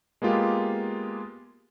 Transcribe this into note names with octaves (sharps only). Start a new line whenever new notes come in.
G#3 A#3 B3 F4 G4